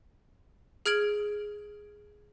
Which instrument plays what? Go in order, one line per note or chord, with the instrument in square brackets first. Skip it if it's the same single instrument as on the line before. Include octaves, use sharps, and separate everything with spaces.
[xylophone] G#4 F6 G#6 D7 F#7